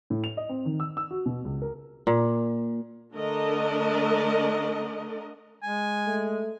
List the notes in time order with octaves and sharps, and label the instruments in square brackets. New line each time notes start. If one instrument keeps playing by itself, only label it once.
[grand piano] A2
F7
D#5
C4
D#3
E6
E6
F#4
B2
C#2
A#4
[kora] A#2
[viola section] D3 A3 D4 A#4 D#5
[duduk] G#3 [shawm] G#5
[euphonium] A3